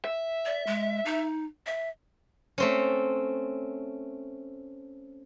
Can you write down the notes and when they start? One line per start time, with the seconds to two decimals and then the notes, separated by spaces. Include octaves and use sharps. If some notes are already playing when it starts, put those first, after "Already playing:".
0.05 E5
0.45 D5
0.67 G#3
1.05 D#4
1.66 E5
2.58 A3 C4 C#4